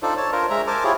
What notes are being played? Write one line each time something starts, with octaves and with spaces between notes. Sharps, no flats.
D4 D#4 F4 A4 C5 D5
C#5 A5
D4 F4 A#4 C5
G#3 E5 A#5
A#4 C5 G#5 A5 D6
E4 F4 G4 G#4 C#5